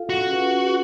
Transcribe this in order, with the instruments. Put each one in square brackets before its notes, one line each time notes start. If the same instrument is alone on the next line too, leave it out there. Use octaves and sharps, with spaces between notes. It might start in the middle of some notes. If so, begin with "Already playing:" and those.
Already playing: [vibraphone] F4 A4 F5
[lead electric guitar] F#4
[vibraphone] C#4 F4 G#4 B4 F#5